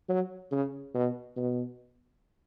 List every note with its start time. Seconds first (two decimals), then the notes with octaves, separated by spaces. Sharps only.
0.09 F#3
0.52 C#3
0.94 B2
1.37 B2